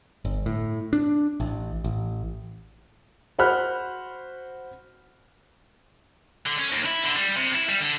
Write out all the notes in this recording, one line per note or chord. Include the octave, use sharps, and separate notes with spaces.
G1
A2
D4
A1
A1
F#4 C5 F#5 B5 F6 F#6
D3
C#4
D#2
E4
D3
G3
C3
E4
G3
D3